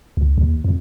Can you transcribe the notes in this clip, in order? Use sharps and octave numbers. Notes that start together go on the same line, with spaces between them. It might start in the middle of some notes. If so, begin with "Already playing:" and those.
C#2
D#2
F2